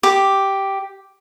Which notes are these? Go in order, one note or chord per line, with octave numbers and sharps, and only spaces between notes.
G4 D6